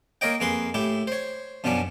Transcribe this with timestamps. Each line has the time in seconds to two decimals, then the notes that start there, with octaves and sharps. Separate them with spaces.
0.21 A#3 A#4 C#5 D#5 G5
0.40 F2 A#3 G#4 B4 C6
0.74 A2 E4 G4
1.07 C5 C#5
1.64 F#2 B2 F3 B3 C#4 D4